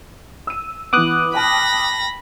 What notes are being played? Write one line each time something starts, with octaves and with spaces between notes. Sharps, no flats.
E6 D#7
E3 B3 D6 D#6 F#6
G5 A5 B5 F6 A#6